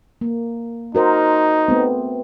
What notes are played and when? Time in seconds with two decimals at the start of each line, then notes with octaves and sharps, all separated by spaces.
0.21 A#3
0.95 D#4 F#4 A#4 C5
1.68 A3 B3 C4